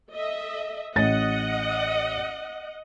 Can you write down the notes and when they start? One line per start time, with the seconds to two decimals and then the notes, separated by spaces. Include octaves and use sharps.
0.11 A4 D#5 E5
0.96 A1 D#5 F#5 A6